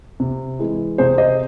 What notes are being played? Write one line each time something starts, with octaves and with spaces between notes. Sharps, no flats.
C3
E3 G#3
C3 G#4 C5
C5 D#5